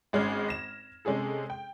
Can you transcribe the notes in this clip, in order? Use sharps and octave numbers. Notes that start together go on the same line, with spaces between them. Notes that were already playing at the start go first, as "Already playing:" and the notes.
G#1 G#3 C#4 F6 G#6
A#6 E7
C3 G#3 C#4 G#4 A4
G5